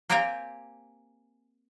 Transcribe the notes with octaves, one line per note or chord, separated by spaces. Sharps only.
A#3 C4 G4 G5 G#5 A#5